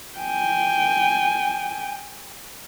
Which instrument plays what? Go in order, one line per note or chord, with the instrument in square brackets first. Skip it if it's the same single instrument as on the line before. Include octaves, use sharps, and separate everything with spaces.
[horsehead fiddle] G5 G#5